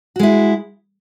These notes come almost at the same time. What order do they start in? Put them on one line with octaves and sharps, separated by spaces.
F#4 G#3 E4